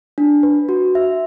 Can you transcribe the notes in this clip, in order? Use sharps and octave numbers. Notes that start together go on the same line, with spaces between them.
D4
B4
F#4
E5